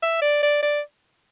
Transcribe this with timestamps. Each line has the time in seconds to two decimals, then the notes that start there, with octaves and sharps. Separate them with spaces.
0.03 E5
0.22 D5
0.43 D5
0.63 D5